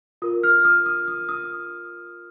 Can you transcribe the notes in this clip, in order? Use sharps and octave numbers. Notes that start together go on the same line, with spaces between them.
F4 A#4 D#6
F6
D#6
D#6
D#6
D#6